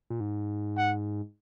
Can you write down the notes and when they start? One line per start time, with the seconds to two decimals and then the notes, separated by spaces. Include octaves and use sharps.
0.10 A#2
0.20 G#2
0.77 F#5